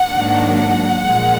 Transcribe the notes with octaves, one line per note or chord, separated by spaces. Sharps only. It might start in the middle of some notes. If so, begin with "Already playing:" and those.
Already playing: F#5
G#2 D#3 F#3 A#3 D4
F#5
A#2 F3 G#3